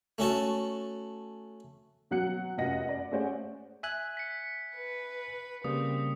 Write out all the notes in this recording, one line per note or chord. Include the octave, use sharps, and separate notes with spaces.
A3 C#4 F#4 A5
B2 F#3 F#5 F#6 C#7
F1 F#2 F4 D#5 F#5 A#6
D5
A3 C#4 G#4 C5 D5 F#5
E5 G#5 F#6
B6 C#7
B4
C#3 G3 A#3 C4 D#6